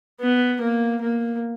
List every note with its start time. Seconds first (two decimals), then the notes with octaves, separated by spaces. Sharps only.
0.21 B3
0.61 A#3
1.02 A#3